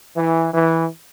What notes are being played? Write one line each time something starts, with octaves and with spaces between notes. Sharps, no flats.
E3
E3